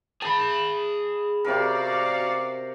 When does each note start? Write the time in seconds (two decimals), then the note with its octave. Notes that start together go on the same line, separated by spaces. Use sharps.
0.22 G#4 A5 B5
1.45 C3 F#4 A#4 D5 F5